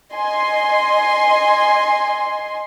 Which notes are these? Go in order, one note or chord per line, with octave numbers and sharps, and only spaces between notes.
D#5 G#5 C6